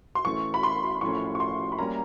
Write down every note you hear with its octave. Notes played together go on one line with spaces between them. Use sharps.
C6
A2 E3 A3 C#4 C#6
B5
C6
A2 F3 A3 C#4 C#6
C#6
C6
B5
G3 A#3 C#4 A#5